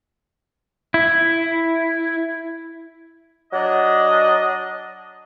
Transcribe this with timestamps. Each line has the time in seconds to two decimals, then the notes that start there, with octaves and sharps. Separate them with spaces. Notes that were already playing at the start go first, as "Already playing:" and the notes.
0.94 E4
3.53 F#3 D4 D#5